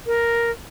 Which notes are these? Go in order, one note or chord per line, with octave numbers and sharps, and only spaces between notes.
A#4